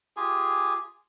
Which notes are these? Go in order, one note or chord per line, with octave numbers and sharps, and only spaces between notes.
F4 G4 G#4 G#5